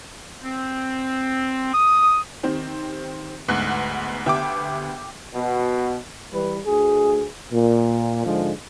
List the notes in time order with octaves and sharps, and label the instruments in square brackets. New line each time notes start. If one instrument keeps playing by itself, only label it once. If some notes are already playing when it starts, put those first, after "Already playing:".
[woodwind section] C4
D#6
[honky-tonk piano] D#3 C4 G4
[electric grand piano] D2 G#2 [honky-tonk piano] B3 F#5 F#6
[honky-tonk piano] D2 B3 G4 [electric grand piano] E5 G5 D6
[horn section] B2
[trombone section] E3 G3 B4
D2 G#4
A#2
G#2 D3 F3 G#3